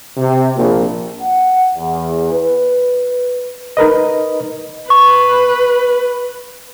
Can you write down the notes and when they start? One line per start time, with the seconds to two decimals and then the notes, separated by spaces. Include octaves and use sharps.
0.17 C3
0.57 A#1
1.22 F#5
1.74 E2
2.32 B4
3.77 D#4 A#4 B4 D#5
4.90 B4 C#6